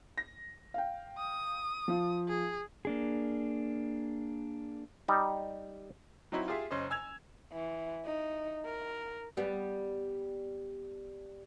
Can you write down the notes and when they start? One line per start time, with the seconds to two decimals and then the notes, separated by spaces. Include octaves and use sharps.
0.18 A#6
0.74 F5 G5
1.18 D#6
1.88 F3 F4
2.28 G#4
2.85 A#3 D4 G#4
5.08 G3 D#4
6.32 F#3 C4 D#4 E4 F#4
6.48 F4 G4 G#4 E5
6.71 F#1 C#4 C5 D#5
6.90 G#5 E6 G#6 F7
7.52 E3
8.05 D#4
8.65 A#4
9.37 G3 B3